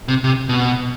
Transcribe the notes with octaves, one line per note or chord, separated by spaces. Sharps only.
C3
C3
B2